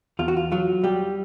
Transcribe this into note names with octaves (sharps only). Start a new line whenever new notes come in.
E2 F4
F#4
F4
F#3 F4
G3 G4